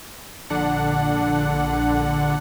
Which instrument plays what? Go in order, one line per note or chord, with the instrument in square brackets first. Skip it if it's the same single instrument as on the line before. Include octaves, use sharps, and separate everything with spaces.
[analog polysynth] A#1 D3 D4 F#5